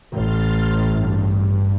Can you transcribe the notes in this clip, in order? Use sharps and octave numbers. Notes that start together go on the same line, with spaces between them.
A1 C6 F6 A6
G2